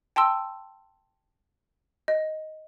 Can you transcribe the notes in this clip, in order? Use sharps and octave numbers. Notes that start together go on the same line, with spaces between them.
G5 A5 C6 E6
D#5